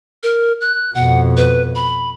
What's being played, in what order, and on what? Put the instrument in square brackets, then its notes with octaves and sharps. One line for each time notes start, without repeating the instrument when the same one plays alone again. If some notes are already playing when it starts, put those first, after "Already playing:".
[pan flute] A#4
F#6
[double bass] F2 B2 [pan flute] F#5
[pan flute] B4
B5